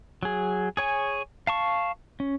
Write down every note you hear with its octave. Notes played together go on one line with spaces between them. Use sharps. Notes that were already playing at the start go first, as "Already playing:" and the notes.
F#3 G#4
G#4 C#5 G#5
F5 A5 C#6
C#4